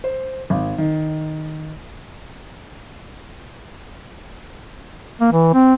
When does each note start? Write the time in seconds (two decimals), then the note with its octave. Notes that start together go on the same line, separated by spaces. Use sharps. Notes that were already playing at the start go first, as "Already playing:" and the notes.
0.04 C5
0.50 G#1
0.78 D#3
5.20 A#3
5.32 E3
5.54 C4